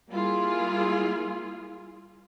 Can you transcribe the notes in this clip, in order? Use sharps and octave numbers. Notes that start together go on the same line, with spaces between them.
G3 A#3 E4 F4 G#4